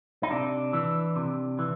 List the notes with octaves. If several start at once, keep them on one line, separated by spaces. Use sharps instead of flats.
D#4
C3 D4
E3
C3
E3